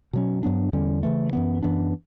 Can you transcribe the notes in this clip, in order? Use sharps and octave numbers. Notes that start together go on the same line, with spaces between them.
B2 F#3 C#4
G2 F#3 B3 D4
E2 D3 G3 C#4
C#3 E3 A3
F#2 E3 B3
F#2 E3 B3 D4